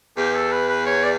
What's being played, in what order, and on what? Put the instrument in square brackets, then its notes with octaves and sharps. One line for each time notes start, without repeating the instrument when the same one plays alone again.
[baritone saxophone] E2 [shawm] G4
[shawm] A4
B4
B4
C#5
D5